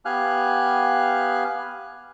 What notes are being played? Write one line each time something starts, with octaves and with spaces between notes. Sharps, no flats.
B3 G4 F5 G#5 F6 F#6